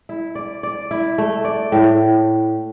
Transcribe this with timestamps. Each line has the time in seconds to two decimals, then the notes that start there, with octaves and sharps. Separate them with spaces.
0.09 E4
0.35 D5
0.63 D5
0.91 E4
1.18 A3
1.44 D5
1.72 A2